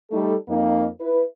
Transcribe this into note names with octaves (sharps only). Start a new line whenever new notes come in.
G3 A3 D#4 A4
F2 A#3 D#4
E4 B4